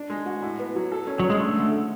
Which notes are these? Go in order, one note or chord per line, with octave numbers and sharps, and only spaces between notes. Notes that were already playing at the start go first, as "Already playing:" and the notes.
Already playing: D4
G#3
F#4
A2
B3
F#3
A4
C#4
F#3 C#4
G#3
A3 D4
D3
D3